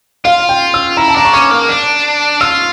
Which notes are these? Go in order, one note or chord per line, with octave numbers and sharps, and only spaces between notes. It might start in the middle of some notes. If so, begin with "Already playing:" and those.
F4 F5
G5
E6
E4 A#5
A5
D4 A#5
C#6
C#4 D6
A#3
D4
F4 E6